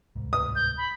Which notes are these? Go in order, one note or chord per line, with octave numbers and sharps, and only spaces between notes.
D1 C2 G#2
D#6
G6
B5